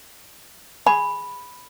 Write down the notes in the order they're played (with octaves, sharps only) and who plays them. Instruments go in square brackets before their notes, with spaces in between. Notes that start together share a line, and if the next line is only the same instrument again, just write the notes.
[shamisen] G#4 [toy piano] B5